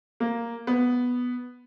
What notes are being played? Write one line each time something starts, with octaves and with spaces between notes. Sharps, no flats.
A#3
B3